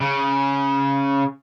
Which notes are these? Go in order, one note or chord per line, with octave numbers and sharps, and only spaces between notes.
C#3